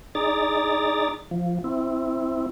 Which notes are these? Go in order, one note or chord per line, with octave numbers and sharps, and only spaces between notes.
D#4 G#4 D5 A#5 A6
F3
C4 E4